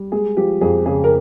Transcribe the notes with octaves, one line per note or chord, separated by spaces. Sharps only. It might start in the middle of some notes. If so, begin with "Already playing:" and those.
Already playing: G3
G#3 G#4
F3 G4
F2 G#4
C#3 G#4
A#4